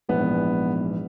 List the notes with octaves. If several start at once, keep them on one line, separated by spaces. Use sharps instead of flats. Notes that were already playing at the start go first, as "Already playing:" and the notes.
A#1 G#2 E3 B3